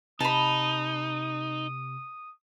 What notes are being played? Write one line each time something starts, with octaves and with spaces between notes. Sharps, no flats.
C3 D#4 A5 B5 D#6